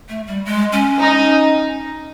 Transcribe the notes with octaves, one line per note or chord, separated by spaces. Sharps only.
A3
G3
G#3
C#4
D#4